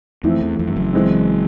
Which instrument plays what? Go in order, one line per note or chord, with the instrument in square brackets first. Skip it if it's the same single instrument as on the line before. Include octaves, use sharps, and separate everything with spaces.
[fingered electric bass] F2 [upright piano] E3 A3 C4 E4
[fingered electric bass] E2
F2
G2
F#1 F#2
[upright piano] E3 G#3 C4